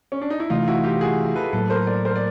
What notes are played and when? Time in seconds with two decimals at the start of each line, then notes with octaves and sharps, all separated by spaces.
0.12 C#4
0.21 D4
0.30 D#4
0.40 E4
0.50 C3 E3 A3 D#4 F4
0.68 E4 F#4
0.84 F4 G4
1.01 F#4 G#4
1.36 A4 B4
1.52 A2 F#3 A#3 A4 B4
1.70 A#4 C5
1.87 C5 D5
2.05 A#4 C5
2.16 D5